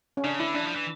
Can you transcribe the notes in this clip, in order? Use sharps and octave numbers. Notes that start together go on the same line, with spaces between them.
C#4
C#3 D4
D3 E4
E3 D4
F3
E3